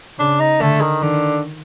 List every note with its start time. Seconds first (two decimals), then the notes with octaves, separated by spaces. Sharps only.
0.18 C#3 D4
0.40 D#4
0.61 D3 A3
0.81 D#3
1.02 D3 D#3